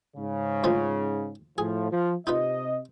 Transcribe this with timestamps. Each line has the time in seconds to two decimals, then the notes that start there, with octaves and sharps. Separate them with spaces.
0.17 G#2 C#3
0.64 D2 F3 D#4
1.58 A2 F3 G#4
1.92 F3
2.27 C3 D#4 F4 B4 D#5